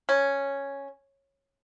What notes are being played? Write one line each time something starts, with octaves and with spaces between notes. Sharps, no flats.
C#4